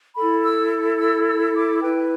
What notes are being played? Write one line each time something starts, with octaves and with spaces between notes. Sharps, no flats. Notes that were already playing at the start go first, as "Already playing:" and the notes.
E4 A4 B5
E6
E6
E6
D6
E4 B4 G5